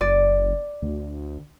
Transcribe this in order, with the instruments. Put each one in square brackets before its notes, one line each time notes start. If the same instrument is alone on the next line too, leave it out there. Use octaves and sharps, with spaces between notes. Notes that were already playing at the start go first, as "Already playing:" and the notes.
[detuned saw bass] F#1 [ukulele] D5
[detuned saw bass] D2